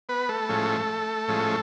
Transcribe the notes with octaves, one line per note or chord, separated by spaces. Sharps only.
B3 B4
A3 A4
A2 F3 G#3 C#4
A2 F3 G#3 C#4